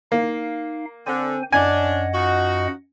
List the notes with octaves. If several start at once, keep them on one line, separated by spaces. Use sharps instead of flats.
A#3 D#4 F5
D3 C4 C5 G#5
F#2 C#4 D4 D#5 F#5 G#5
F3 D#4 F#4